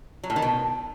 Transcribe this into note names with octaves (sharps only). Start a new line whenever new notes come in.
F#3
A2
D#3
B2